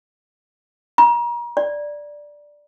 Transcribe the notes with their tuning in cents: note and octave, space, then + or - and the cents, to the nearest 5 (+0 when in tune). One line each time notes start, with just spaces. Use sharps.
A#5 +35
D5 +0